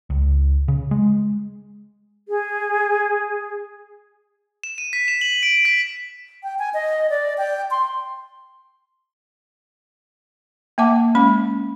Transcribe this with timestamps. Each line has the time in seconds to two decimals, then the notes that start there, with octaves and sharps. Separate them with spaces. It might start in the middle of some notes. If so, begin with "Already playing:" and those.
0.10 C#2
0.68 C#3
0.91 G#3
2.29 G#4
4.63 E7
4.78 D#7
4.93 B6
5.08 E7
5.21 F#7
5.43 D7
5.65 B6
6.43 G5
6.59 G#5
6.74 D#5
7.10 D5
7.38 G5
7.71 C6
10.78 A#3 E5 F#5 A5 D6
11.15 G#3 C#4 B5